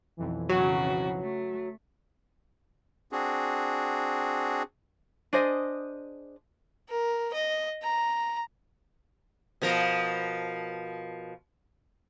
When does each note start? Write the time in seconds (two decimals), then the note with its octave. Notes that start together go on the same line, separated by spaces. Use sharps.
0.17 B1 F2 E3
0.49 C#3 F#3 F#4
1.19 A3
3.12 C4 D4 F#4 G#4
5.33 D4 G#4 C5 D#5
6.90 A#4
7.34 D#5
7.83 A#5
9.62 B2 F3 A#4